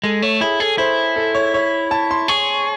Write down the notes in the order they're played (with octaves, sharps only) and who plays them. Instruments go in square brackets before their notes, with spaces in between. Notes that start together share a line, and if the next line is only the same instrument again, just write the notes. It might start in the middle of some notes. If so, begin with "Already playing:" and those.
[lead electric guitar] G#3 [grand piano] A4
[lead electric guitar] A3 [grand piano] C#5
[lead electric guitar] E4 [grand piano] G#4
[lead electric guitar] G#4 [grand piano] A4
[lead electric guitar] E4 [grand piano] C5
[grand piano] A4
C#5
C#5
A5
C6
[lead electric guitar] G#4 [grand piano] C#6